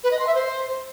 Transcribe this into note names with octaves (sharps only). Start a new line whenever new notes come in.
B4
D#5
C6
E5
C5